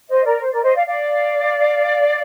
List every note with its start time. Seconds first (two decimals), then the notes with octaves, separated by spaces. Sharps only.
0.09 C5 D#5
0.24 A#4 D5
0.40 C5
0.52 A#4 D5
0.63 C5 D#5
0.75 D5 F5
0.86 D5 F5